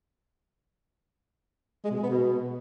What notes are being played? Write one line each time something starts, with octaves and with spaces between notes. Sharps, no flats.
G#3
B2
G#3
B3
B2